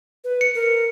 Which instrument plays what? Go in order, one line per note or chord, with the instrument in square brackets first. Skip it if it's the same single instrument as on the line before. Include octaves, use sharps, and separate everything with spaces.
[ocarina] B4
[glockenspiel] C#7
[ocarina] A#4